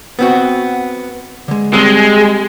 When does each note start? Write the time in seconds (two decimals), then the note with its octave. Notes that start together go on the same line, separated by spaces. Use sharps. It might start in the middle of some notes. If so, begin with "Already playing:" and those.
0.19 B3 C4 F#4
1.48 D3 G#3
1.73 G3 G#3 C4 C6